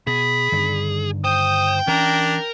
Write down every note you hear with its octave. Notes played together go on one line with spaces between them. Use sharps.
B2 G#4 B5
G2 D3 D#3
C5 G5 D#6
E3 C#4 D4 A#4 A#5